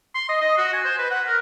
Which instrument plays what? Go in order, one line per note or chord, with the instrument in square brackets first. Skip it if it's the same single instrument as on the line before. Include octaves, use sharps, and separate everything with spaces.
[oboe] C6
D#5
D#5
F#4
G#5
C5
B4
F#5
A#4